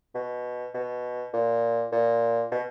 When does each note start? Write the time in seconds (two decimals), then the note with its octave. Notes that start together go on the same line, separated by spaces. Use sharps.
0.15 B2
0.74 B2
1.33 A#2
1.92 A#2
2.51 B2